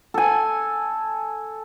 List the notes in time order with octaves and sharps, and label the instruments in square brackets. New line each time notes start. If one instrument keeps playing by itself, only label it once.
[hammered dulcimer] A4 G#5